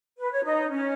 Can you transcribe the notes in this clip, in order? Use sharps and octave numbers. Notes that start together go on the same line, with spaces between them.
B4
C#5
D#4
C#4